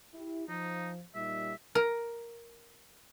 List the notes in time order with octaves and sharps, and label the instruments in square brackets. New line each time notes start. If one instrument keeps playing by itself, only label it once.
[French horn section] E4 G4
[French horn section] F3 [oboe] D#4
[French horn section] A#2 G3 D#4 [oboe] E5
[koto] A#4